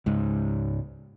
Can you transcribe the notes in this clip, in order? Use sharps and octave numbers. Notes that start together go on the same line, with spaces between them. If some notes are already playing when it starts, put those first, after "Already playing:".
C#2 G#2